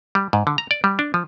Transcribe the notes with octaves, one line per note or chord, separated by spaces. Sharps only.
G3
G#2
D3
A#5
D5
G3
D4
F3